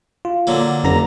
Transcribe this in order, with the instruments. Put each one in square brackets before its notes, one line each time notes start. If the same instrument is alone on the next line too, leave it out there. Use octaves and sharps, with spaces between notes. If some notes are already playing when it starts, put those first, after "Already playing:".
[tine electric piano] F4
[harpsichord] D3 F#3 A#3
[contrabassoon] F#1 [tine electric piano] F2 A#5 A#6